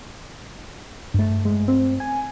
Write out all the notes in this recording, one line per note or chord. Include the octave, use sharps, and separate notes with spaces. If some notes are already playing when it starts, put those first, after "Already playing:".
G2 A3
G#3
C4
G#5